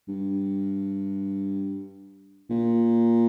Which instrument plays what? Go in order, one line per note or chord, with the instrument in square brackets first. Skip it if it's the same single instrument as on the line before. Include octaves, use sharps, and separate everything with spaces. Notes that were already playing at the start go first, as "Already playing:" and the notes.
[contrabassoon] G2
A#2